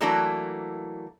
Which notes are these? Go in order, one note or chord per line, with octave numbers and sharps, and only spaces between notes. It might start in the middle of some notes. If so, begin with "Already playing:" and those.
E3 F#3 A3 A#3 D4 E4